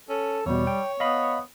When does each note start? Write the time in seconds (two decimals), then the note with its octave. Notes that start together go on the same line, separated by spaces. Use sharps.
0.09 C#4 A4
0.46 E2 B2 G3 C#5
0.67 G5
1.00 B3 D#5 F5 B5